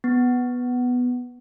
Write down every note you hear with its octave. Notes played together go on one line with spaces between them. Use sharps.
B3